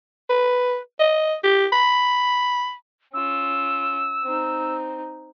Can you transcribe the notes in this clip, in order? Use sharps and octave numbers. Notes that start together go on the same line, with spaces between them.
B4
D#5
G4
B5
C#4 F4 E6
C4 D#4